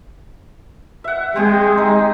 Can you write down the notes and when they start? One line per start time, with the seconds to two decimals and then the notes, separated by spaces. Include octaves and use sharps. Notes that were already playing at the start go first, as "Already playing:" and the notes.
1.04 E5 F#5
1.36 G#3 C4 G4 G#4
1.78 D#4